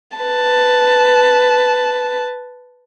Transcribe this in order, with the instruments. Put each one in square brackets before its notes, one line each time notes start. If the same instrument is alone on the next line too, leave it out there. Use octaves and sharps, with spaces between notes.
[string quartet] B4 A5